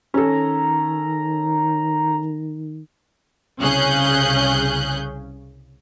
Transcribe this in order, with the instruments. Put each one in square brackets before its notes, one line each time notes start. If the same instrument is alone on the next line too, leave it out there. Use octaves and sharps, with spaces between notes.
[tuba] D#3 [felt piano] C#4 A4 [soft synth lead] A#5
[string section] C2 C#3 C#4 G#4 F#6 G6